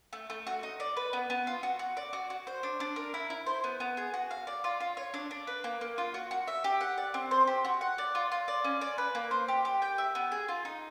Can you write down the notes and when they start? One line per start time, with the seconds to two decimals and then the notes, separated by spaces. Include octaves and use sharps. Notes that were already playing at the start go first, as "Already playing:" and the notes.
0.13 A3
0.30 A3
0.47 F#4
0.63 D#4
0.80 D5
0.97 B4
1.13 B3
1.30 B3
1.47 F4
1.63 F#4
1.79 F#4
1.97 D5
2.13 F#4
2.30 F#4
2.47 C5
2.63 D4
2.80 D4
2.96 A#4
3.14 E4
3.30 E4
3.46 C5
3.64 B3
3.80 B3
3.97 G#4
4.14 F#4
4.31 F5
4.47 D5
4.64 F4
4.80 F4
4.97 C#5
5.14 D4
5.31 D4
5.47 B4
5.64 A#3
5.81 A#3
5.98 F4
6.14 F#4
6.31 F#4
6.48 E5
6.64 G4
6.81 F#5
6.98 D5
7.14 C4
7.31 C5
7.47 G4
7.65 F#4
7.81 F#5
7.98 D5
8.15 F4
8.32 F4
8.48 D5
8.64 C#4
8.81 D5
8.98 B4
9.15 A#3
9.31 C5
9.48 G4
9.65 G4
9.82 G5
9.98 E5
10.15 B3
10.32 G#4
10.48 F4
10.65 D#4